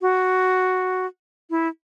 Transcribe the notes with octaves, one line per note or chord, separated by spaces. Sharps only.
F#4
E4